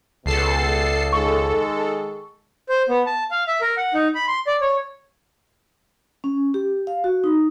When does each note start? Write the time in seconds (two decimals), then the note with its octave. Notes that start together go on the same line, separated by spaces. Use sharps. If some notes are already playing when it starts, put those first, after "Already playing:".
0.26 C#2 B2 G#3 A4 A5 C7
1.13 D#3 G#3 A4 C#6
2.69 C5
2.89 B3
3.06 A5
3.31 F5
3.47 E5
3.61 A#4
3.77 F#5
3.94 D#4
4.15 B5
4.27 C6
4.47 D5
4.61 C#5
6.24 C#4
6.54 G4
6.87 F5
7.04 F#4
7.24 D#4